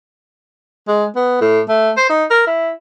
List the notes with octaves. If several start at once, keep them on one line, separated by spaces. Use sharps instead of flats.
G#3
B3
A2
A3
C5
D#4
A#4
E4